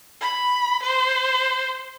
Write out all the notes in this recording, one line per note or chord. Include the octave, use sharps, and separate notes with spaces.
B5
C5